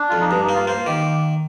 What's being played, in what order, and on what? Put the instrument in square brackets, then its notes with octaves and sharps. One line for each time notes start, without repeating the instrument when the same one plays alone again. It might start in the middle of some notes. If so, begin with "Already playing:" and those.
Already playing: [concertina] D4
[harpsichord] F2 [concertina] F4
[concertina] D#4
[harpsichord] G2 [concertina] D4
[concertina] D#4
[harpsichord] A#3
[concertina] F4
[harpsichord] A#3 [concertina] C5
[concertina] F4
[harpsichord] D#3 [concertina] G4